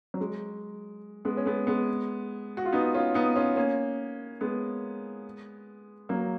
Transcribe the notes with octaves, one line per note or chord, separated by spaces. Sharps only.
F#3
G#3
G#3 B3
C#4
G#3 B3
G#3 B3
F#4
F4
B3 D#4
C#4 F4
B3 D#4
C#4 F4
A#3 C#4
G#3 B3
F#3 A#3